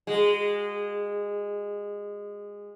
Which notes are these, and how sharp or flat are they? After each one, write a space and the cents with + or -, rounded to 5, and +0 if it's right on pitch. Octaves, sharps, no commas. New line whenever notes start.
G#3 -20 F#4 +0